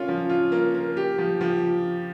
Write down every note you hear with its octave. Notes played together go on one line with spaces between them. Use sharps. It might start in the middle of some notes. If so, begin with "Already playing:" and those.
Already playing: A#3 C#4 F4
F3
F4
A#3
A#3
G4
F3
F3